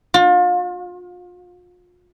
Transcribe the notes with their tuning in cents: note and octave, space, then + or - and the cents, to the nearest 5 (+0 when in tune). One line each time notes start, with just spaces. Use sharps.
F4 +35